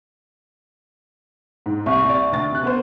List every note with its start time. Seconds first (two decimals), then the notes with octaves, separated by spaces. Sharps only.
1.66 G#2
1.86 C2 E5 C#6
2.05 C2 D5
2.32 D2 A6
2.51 C3 F#6
2.64 B3 A#4 C5